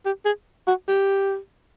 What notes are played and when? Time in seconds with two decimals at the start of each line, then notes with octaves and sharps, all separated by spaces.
0.05 G4
0.25 G#4
0.67 F#4
0.88 G4